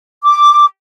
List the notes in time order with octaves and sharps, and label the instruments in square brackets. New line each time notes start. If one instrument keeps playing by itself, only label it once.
[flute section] D6